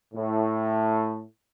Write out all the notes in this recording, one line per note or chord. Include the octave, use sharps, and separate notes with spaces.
A2